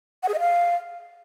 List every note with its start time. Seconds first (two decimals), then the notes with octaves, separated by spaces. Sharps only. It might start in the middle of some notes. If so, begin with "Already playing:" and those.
0.23 F#5
0.28 G#4
0.34 D#5
0.39 F5